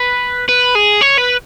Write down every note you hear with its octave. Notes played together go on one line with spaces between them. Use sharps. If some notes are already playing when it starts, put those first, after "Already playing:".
Already playing: B4
B4
G#4
C#5
B4